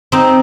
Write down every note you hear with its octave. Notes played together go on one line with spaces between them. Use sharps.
C4 D#4